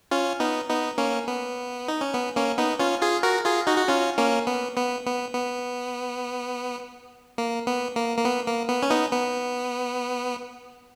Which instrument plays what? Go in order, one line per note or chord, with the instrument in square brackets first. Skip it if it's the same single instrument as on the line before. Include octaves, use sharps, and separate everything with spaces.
[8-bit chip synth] C#4 F4
B3 D#4
B3 D#4
A#3 C#4
B3
D#4
C#4
B3
A#3 C#4
B3 D#4
C#4 F4
F4 G#4
F#4 A#4
F4 G#4
D#4 F#4
F#4
C#4 F4
A#3 C#4
B3
B3
B3
B3
A#3
B3
A#3
A#3
B3
A#3
B3
C#4
B3 D#4
B3